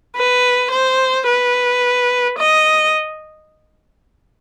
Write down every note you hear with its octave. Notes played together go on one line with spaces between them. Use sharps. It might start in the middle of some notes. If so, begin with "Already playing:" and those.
B4
C5
B4
D#5